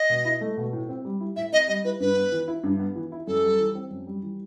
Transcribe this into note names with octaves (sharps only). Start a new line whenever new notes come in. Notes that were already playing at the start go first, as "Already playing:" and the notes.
Already playing: D#5
B2
E4
A3
B2
A2
C4
G3
E4
A2 E5
C4 D#5
G3 D#5
E4 B4
G2 B4
B3
E3
E4
G2
B3
E3
E4
F#2 A4
G3
E3
C4
F#2
G3
E3